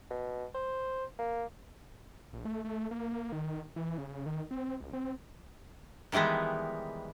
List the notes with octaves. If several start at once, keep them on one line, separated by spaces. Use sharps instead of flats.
B2
C5
A#3
A#1
A3
A3
A#3
A#3
D#3
E3
C#3
D#3
C4
C#2
C4
D#3 E3 G3 G#3 B3